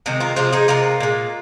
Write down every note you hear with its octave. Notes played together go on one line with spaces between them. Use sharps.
C3 D#3 G#3 C4
F4 A#4
C3 F3 G#3 C4 F4
D#4 G#4
C3 G#3 F4 A#4
A#2 G#3